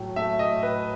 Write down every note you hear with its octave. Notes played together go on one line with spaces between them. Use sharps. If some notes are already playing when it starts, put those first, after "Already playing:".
Already playing: A2 F#3
A3 E5
D#5
A2
B4